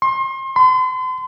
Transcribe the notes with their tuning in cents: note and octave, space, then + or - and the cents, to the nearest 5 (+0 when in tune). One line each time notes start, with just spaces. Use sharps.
C6 +35
C6 -40